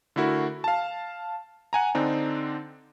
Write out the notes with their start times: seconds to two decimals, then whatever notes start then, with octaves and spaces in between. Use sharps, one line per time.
0.16 D3 A3 E4 F#4 A#4
0.64 F5 A5
1.73 F#5 G#5 A#5
1.95 D3 C4 D4 D#4